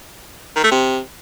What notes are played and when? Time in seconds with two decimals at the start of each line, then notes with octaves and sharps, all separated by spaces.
0.56 D#3
0.64 A3
0.71 C3